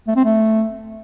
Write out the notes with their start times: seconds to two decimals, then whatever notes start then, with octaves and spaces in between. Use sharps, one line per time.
0.08 A3
0.16 C4
0.25 A3